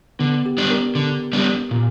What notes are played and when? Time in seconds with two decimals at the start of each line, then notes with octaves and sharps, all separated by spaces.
0.19 D3 B3
0.46 G4
0.58 G3 B3 D4
0.70 A#4
0.95 D3
1.33 G3 B3 D4
1.71 A#2